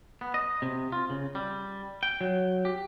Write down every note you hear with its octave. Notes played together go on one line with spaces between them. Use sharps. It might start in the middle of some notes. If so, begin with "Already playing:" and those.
B3
D#5
C3
F4
C#3
G3
G5
F#3
G4